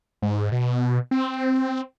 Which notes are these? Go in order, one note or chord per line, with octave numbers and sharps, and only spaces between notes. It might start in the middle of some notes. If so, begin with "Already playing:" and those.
G#2
B2
C4